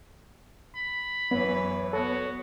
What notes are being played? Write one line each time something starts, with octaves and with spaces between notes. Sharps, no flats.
B5
F#2 E3 B3 B4 C#5
B3 F#4 A4